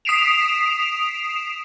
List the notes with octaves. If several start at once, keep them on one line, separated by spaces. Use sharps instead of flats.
D#6 B6 C7 D7 E7 F7